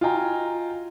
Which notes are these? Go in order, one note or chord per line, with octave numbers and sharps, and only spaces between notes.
F4 F#4 D#5 G5 G#5 A#5